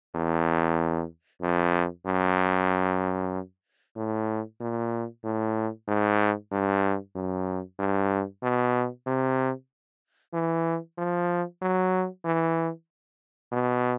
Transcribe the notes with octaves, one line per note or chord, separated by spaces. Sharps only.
E2
F2
F#2
A2
A#2
A2
G#2
G2
F#2
G2
B2
C3
E3
F3
F#3
E3
B2